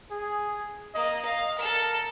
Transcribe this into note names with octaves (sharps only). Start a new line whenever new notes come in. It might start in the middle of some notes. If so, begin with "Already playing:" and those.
G#4
A#3 D#5
F5
A4 A#4 E6